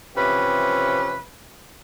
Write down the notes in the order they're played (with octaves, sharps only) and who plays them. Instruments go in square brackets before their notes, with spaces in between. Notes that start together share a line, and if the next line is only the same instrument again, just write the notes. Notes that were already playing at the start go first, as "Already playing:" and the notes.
[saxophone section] C3 E3 F3 C#4 G4 B4